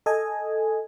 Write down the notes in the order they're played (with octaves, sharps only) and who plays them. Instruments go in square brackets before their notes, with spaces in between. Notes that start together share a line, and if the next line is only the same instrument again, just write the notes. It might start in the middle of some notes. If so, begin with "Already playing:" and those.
[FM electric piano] A4 D#5 G#5